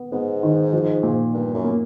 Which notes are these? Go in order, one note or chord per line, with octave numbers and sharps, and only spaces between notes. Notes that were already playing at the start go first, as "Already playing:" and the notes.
Already playing: B3
G#2 B3
D#3
F3
A#2
G2 A#3
F#2
A#3